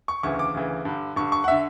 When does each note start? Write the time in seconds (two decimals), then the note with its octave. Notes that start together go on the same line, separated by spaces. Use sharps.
0.08 C#6
0.23 D2 C#3 E3 C#6
0.39 D6
0.54 D2 C#3 E3
0.85 G2 D3
1.16 G2 D3 C#6
1.32 C#6
1.44 F#5
1.48 D3 E5